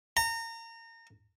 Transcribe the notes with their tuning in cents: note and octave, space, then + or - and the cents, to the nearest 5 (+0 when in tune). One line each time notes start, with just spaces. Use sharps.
A#5 -30